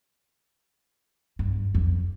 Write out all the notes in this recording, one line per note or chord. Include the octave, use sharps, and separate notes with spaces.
G2
F2